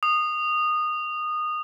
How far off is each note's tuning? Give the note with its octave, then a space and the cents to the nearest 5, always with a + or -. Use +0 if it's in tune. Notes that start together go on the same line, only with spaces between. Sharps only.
D#6 -20